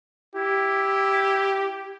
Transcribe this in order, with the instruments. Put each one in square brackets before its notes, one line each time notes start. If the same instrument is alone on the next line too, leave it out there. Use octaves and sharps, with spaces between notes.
[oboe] E4 [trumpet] G4